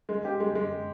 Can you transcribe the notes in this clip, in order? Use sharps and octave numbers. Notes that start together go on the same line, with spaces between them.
G#3
G4
G#3
G#3